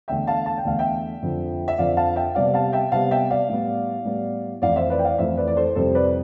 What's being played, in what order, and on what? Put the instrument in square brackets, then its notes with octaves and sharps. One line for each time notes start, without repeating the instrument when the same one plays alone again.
[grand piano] E2 D3 A3 E5 G5
F5 A5
A5
G5
E2 D3 A3 F5
E5 G5
F2 D3 F3
E5
F2 D3 F3 D5 F5
F5 A5
E5 G5
C3 G3 B3 D5 F5
F5 A5
E5 G5
C3 G3 B3 F5 A5
E5 G5
D5 F5
A2 G3 B3
A2 G3 B3
F2 E3 A3 E4 D5 F5
C5 E5
B4 D5
G5
D5 F5
F2 E3 A3 E4 C5 E5
B4 D5
D5
A4 C5
F2 C3 G3 C4 E4 A4 C5
B4 D5